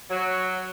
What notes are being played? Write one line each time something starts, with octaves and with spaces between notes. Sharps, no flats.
F#3